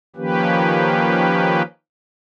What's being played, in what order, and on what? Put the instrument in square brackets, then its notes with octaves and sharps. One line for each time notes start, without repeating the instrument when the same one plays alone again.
[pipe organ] D#3 F3 A#3 C#4 G4 B4